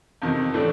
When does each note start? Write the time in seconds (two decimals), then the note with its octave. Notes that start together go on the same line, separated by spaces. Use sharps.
0.22 F2 C3 D#3
0.54 A2 E3 A3 D4